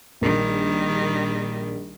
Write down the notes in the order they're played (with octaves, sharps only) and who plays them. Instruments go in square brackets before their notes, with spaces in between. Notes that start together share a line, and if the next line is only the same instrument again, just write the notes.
[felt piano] A#1 A#4 [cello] D#3 G3